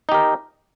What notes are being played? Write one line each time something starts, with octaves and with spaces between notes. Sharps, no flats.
D#4 G4 A#4